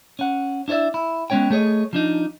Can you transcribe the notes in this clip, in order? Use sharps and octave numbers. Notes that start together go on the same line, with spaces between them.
C#4 F#5
D4 E4 C#5 D5 E5
E4
G#3 B3 C#4 C#5 G5
A3 G#4 C#5 D#5
F3 D4 D#4